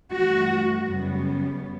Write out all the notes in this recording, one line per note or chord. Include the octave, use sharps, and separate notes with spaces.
G2 E3 A3 F#4
F#2 C#3 G3 B3